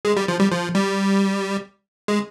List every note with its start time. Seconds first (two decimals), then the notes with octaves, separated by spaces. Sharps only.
0.05 G#3
0.17 G3
0.28 F3
0.40 G3
0.52 F3
0.75 G3
2.08 G#3